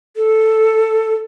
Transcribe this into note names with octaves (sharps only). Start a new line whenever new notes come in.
A4